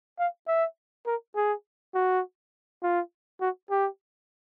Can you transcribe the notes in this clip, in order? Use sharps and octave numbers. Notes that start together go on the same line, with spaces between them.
F5
E5
A#4
G#4
F#4
F4
F#4
G4